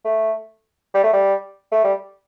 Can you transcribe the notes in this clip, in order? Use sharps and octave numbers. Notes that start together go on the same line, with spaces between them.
A3
G3
A3
G3
A3
G3